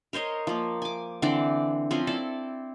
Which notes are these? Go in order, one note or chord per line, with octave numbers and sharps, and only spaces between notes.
A#4 C5 C#5 D#5
F3 A#3
G#5 D6
D3 E3 C4 D5
F3 C4 C#4 G#5
E4 A4 D5